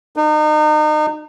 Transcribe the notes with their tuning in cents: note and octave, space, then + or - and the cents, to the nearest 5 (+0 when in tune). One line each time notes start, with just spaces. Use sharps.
D#4 -35